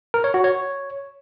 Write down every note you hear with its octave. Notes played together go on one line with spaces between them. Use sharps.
A#4
C#5
F#4
C#5